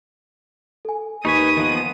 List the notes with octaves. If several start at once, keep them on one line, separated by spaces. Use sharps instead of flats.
A4 G#5
D#2 D#4 B4 G#5 C#6 D#6 B6
D#3 F3 B3